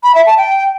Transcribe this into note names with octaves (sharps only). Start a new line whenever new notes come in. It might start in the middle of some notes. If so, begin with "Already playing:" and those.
B5
E5
A5
G5